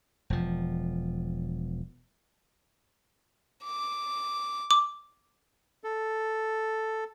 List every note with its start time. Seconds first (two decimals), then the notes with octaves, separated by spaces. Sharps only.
0.30 E1 F3
3.64 D6
4.71 D6
5.84 A4